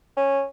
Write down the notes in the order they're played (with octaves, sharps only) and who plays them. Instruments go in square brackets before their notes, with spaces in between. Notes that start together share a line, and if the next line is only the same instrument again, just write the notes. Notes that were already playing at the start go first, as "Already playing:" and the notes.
[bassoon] C#4